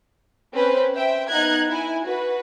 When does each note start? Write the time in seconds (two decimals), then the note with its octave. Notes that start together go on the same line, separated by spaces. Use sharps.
0.52 C4 C#4 B4 C5
0.94 C5 E5 G5
1.29 B3 D#4 F#6 G#6
1.69 E4 G#5
2.05 F#4 B4